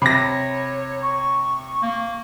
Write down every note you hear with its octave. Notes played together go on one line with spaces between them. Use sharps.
C3 C#5 B5 A#6
C#6
A#3